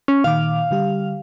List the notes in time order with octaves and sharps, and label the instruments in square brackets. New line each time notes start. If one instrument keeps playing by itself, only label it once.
[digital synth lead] C#4
[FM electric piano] A#2 D#3 D6 [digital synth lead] F5
[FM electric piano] D3 G3 G4